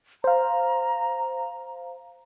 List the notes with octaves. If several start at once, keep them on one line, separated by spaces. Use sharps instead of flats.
C5 F5 A#5